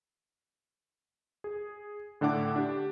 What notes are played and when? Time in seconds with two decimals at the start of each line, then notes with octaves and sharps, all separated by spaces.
1.44 G#4
2.21 A2 D3 D4 F#5 D6
2.56 D4 G4